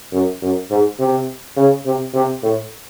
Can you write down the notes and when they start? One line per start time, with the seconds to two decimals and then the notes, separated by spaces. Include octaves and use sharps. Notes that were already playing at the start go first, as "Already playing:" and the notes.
0.12 F#2
0.42 F#2
0.70 G#2
0.99 C3
1.57 C#3
1.86 C3
2.14 C3
2.43 A2